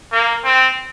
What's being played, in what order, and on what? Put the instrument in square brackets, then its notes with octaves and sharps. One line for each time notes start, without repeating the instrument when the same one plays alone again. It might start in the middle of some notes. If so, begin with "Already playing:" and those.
[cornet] A#3
C4